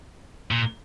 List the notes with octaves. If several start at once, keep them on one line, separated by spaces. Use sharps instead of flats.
A#2